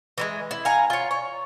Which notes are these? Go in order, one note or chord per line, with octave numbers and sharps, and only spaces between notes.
E3 G3 G#3
E4
F5 F#5 G#5 A#5
F4 C#5
C#5